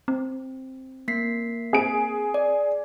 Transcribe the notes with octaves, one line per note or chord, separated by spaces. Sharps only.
C4
A#3 B6 C7
C4 G#4 D7
D5